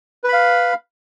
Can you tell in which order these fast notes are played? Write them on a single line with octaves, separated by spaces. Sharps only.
B4 B5 F5